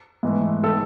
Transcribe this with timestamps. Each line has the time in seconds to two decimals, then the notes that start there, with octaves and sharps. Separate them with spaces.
0.23 G#2 E3 A3
0.63 D#3 G#3 A4